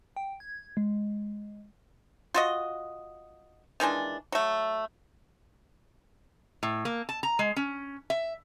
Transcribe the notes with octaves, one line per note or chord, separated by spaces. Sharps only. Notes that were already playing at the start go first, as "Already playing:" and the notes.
G5
G#6
G#3
F4 F#4 D#5
D#3 E3 G#3 D4
F#3 A3
A2
A#3
A5
A#5
G#3
C#4
E5